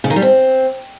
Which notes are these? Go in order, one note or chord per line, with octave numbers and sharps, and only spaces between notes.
C#3
D#3
G3
C4